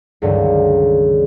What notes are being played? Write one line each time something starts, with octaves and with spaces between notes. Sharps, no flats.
C#2 G2 D3 D#3 F#3 G3